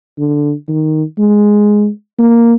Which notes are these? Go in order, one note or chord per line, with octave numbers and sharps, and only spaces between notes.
D3
D#3
G#3
A#3